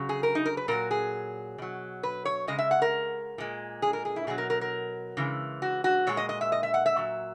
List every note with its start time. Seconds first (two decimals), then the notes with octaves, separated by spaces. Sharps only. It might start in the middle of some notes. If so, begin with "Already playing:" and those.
Already playing: C#3 F#3
0.09 G#4
0.23 A#4
0.35 D#4
0.45 A#4
0.57 B4
0.68 A#2 F#3 A#4
0.91 G#4
1.58 B2 F#3
2.03 B4
2.25 C#5
2.48 C#3 G#3 D#5
2.58 E5
2.71 F#5
2.82 A#4
3.38 A#2 G#3
3.82 G#4
3.93 A#4
4.05 G#4
4.16 E4
4.27 B2 F#3 G#4
4.38 A#4
4.50 A#4
4.61 A#4
5.17 C#3 E3 G#3
5.62 F#4
5.84 F#4
6.07 A#2 G#3 C#5
6.17 D#5
6.29 D#5
6.41 E5
6.52 D#5
6.63 E5
6.74 F#5
6.86 E5
6.97 A#2 F#3